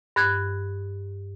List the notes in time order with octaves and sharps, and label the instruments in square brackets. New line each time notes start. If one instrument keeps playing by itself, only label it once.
[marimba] G2 F#6 G#6